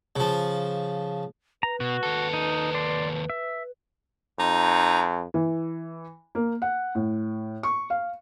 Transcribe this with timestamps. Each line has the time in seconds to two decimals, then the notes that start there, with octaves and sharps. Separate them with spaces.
0.16 C#3 F3
1.63 B4 A#5
1.80 B2 F#4
2.03 D#2 A4
2.34 D#4
2.75 D5 C6
3.30 E5
4.39 F2 D#4
5.34 E3
6.35 A#3
6.62 F#5
6.95 A2
7.63 C#6
7.90 F5